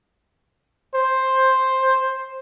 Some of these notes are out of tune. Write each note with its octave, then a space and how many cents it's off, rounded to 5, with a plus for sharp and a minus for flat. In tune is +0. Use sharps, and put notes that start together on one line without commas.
C5 +10